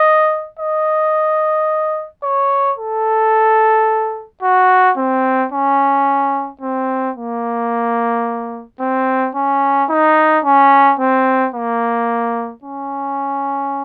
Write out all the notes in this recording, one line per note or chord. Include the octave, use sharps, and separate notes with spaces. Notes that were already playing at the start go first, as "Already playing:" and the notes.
Already playing: D#5
D#5
C#5
A4
F#4
C4
C#4
C4
A#3
C4
C#4
D#4
C#4
C4
A#3
C#4